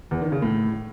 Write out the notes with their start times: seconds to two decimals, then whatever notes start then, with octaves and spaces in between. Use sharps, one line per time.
0.11 E2
0.22 D#3
0.32 C#3
0.42 A2